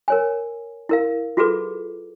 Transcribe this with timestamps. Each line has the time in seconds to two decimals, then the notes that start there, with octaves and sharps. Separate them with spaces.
0.08 A#4 C#5 G#5
0.89 E4 A#4 F5
1.37 F4 F#4 G#4 A4 B4 D6